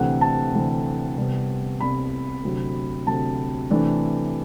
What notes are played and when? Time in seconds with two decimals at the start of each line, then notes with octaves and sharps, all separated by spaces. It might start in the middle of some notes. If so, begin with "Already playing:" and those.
Already playing: D2 C3 E3 A3 F#5
0.21 A5
0.53 D2 C3 E3 A3
1.17 C2 C3 G3 B3
1.80 C2 C3 G3 B3 B5
2.43 D2 C3 F#3
3.07 D2 C3 F#3 A5
3.70 C3 E3 A3 D4